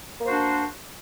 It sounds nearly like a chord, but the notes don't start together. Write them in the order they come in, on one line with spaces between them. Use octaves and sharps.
A#3 C5 F#4 D4